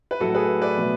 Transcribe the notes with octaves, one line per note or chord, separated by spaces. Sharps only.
B4
A2 F#3 A3 F#4 A4
G#4 B4
B4 D5
B2 F#3 A3